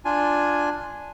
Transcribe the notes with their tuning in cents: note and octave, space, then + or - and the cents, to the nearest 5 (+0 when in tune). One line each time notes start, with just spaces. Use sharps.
D4 +0 F4 +0 G#5 +0